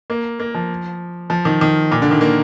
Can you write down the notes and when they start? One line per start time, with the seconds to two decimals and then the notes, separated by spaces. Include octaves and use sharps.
0.10 A#3
0.40 A#3
0.55 F3
1.30 F3
1.45 D#3
1.61 D#3
1.91 A#2
2.02 D3
2.11 D#3
2.21 A#3